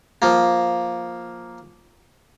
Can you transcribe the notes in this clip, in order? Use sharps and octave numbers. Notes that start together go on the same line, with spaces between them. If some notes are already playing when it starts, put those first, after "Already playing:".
F3 A#3